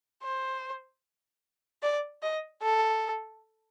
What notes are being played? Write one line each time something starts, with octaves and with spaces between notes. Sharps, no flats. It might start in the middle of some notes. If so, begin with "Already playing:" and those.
C5
D5
D#5
A4